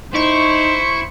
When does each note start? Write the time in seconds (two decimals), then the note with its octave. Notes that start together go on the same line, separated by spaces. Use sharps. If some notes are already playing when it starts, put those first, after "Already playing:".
0.15 D#4 E4 C5 C#6